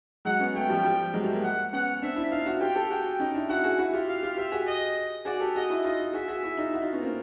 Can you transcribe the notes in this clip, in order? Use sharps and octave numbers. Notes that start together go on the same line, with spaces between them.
F#3 G#3 F#5
B3 C#4
A3 B3 G5
F3 G3
F3 G3
F#3 G#3
G3 A3
G#3 A#3
F#5
B3 C#4 F#5
C4 D4 E5
D4 E4
D#4 F4 F5
E4 F#4
F4 G4 G5
G4 A4
F#4 G#4 G5
C#4 D#4
D4 E4
E4 F#4 F#5
F#4 G#4
E4 F#4
F4 G4
F5
F4 G4
F4 G4 E5
F#4 G#4
D#5
F#4 G#4 D5
G4 A4
F#4 G#4 D#5
E4 F#4
D#4 F4 D#5
F#4 G#4 E5
F#4 G#4
E4 F#4
D#4 F4
E4 F#4
D#4 F4
B3 C#4
A#3 C4